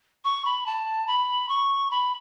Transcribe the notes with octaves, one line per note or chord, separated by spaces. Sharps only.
C#6
B5
A5
B5
C#6
B5